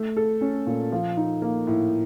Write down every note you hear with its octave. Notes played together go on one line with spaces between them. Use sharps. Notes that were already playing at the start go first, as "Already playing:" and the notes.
Already playing: A3
A4
C#4
A#2
F3
D#4
A#3
A2